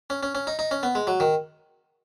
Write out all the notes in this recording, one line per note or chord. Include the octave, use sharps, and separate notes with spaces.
C#4
C#4
C#4
D#4
D#4
C#4
B3
G#3
F#3
D#3